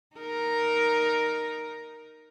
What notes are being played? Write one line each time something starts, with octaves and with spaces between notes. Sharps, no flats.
D#4 A#4